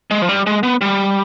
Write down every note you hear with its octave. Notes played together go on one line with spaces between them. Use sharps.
G#3
F3
G3
G#3
B3
G3